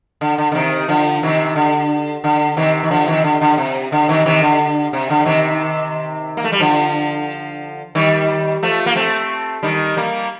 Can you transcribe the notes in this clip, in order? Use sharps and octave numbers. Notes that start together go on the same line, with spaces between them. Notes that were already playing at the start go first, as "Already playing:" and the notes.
D3
D3
D3
C3 D#3
D3 F3
C3 D#3
D3
D3
C3 D#3
D#3
D3 F3
C3 D#3
D3
D3
C3
D3
C3 D#3
C3 D#3
D3
C3
D3
C3 D#3
A#3
A3
G3
D3 F3
D#3 G3
F3 A3
A#3
A3 C4
D#3 G3
G3 A#3